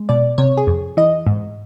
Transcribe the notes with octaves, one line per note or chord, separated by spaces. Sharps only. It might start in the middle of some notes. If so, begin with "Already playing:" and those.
Already playing: G#3
B2 D5
C3 C#5
G#4
F2
E3 D#5
G#2